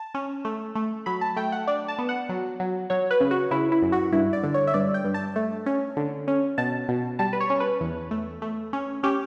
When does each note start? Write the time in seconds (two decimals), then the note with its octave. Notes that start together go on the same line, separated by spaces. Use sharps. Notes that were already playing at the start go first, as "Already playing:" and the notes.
Already playing: A5
0.14 C#4
0.45 A3
0.75 A3
1.06 F#3 B5
1.21 A5
1.36 A3 G5
1.52 F#5
1.67 D4 D5
1.88 A5
1.98 B3
2.09 F#5
2.29 F#3
2.60 F#3
2.90 F#3 C#5
3.11 B4
3.20 C#3
3.31 F#4
3.51 C#3 E4
3.72 E4
3.82 F#2
3.92 F#4
4.12 G2 E4
4.33 D5
4.43 D3
4.54 C#5
4.67 E5
4.74 G2 D5
4.94 G5
5.04 G2
5.14 A5
5.36 A3
5.66 C#4
5.97 D3
6.28 C#4
6.58 B2 A5
6.88 B2
7.19 G3 A5
7.33 B4
7.40 C#5
7.50 C#4
7.60 B4
7.81 E2
8.11 A3
8.42 A3
8.73 C#4
9.03 C#4 G4